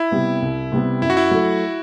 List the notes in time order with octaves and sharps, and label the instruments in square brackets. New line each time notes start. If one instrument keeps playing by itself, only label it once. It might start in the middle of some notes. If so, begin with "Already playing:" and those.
Already playing: [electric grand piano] E4
[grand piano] C3 G3 B3
C2
C3 G3 B3
[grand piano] F#2 [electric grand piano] E4
[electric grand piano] F#4
E4
[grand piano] F#3 A3